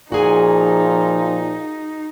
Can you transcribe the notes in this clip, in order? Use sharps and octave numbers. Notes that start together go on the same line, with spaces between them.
A#2 F3 D#4 F#4 G#4 G#5